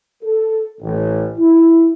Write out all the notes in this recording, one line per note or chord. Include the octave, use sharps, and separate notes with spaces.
A4
A1
E4